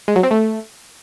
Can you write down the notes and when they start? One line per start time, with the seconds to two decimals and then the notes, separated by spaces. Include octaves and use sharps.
0.08 G#3
0.16 F#3
0.23 C4
0.31 A3